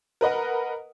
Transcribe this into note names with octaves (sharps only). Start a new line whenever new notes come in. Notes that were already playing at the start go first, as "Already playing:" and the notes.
A#4 B4 D#5 F#5